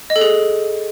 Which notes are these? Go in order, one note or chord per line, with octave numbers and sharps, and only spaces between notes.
D#5
A4
G#4